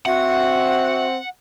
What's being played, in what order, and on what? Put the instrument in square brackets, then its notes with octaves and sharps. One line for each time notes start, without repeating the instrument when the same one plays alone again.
[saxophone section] C4 [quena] F#4 [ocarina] E5 [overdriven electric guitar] F#5